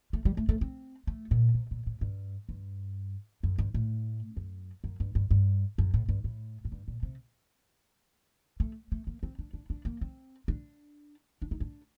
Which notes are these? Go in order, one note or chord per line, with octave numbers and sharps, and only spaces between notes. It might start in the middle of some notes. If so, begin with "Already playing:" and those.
A3
G3
A3
A3
C4
A3
A#2
C3
A#2
A2
G2
G2
F#2
G2
A2
F#2
F#2
G2
G2
G2
F#2
A2
G2
A2
A2
G2
A#2
C3
A3
A3
A#3
C4
D4
D4
D4
A#3
C4
D4
D4
D#4
D4